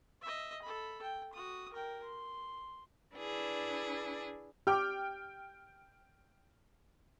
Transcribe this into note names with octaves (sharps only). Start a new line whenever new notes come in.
D#5 E5
A4 B5
G5
F#4 D#6
A#4 G5
C6
D4 E4 G#4 B4
G4 G5 F6